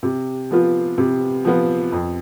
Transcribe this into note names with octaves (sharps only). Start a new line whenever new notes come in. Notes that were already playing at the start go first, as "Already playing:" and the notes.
C3
F3 B3 F4
C3
F3 B3 F4
F2